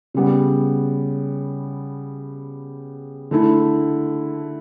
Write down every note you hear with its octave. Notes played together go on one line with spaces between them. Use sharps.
C#3 G3 B3
D3 A3 E4